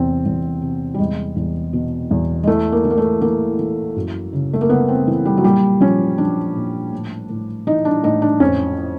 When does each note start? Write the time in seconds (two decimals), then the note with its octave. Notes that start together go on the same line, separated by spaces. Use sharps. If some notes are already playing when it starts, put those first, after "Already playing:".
Already playing: E2 C3 C4
0.26 E2
0.62 C3
0.94 G3
0.99 E2 G#3
1.36 E2
1.73 B2
2.11 E2
2.43 G#3
2.47 E3 A3
2.72 A#3
2.85 E3
2.91 A#3
2.98 A3
3.21 E3 A#3
3.59 E3
3.96 F#2
4.33 C#3
4.53 A3
4.61 A#3
4.69 C#3 B3
4.88 C4
5.07 E3
5.25 G3
5.37 F#3
5.44 A#2 G3
5.81 F3 C#4
6.18 F3 D4
6.55 A#2
6.93 A2
7.29 A2
7.67 E3 D#4
7.85 D4
8.04 A2 D#4
8.22 D4
8.40 F2 C#4